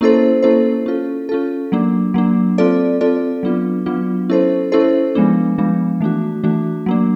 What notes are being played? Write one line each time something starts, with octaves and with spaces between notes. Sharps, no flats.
A#3 C#4 E4 A4 C5
A#3 C#4 E4 A4 C5
C#4 F4 A4
C#4 F4 A4
F#3 A#3 D4
F#3 A#3 D4
C4 F4 A4 D5
C4 F4 A4 D5
F#3 B3 D4 F4
F#3 B3 D4 F4
C#4 E4 A4 C5
C#4 E4 A4 C5
F3 G#3 B3 D4
F3 G#3 B3 D4
E3 A3 D4 F#4
E3 A3 D4 F#4
F#3 A#3 D4